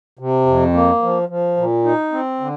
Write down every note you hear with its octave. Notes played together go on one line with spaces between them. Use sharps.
C3
F2
A#3
F3
F3
A#2
D#4
C4
D3